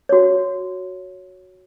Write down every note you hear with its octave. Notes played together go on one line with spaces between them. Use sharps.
F#4 C#5